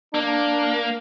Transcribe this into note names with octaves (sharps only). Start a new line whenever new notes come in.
A#3 D4